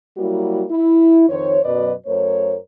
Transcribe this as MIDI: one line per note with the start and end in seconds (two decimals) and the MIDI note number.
0.18 0.63 54
0.18 0.63 55
0.18 0.63 58
0.18 0.63 64
0.18 0.63 66
0.70 1.25 64
1.29 1.58 41
1.29 1.58 51
1.29 1.58 72
1.29 1.58 73
1.64 1.93 42
1.64 1.93 47
1.64 1.93 54
1.64 1.93 71
1.64 1.93 74
1.64 1.93 75
2.06 2.56 42
2.06 2.56 57
2.06 2.56 70
2.06 2.56 72
2.06 2.56 73